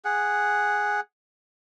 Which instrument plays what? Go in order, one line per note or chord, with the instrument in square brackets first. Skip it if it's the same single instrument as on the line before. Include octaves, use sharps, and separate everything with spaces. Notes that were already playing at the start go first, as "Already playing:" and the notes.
[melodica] G#4 F#5